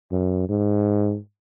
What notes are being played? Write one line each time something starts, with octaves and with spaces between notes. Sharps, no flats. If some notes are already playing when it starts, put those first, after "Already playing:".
F#2
G#2